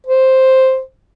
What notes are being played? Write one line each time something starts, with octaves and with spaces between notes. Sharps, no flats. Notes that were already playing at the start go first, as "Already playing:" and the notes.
C5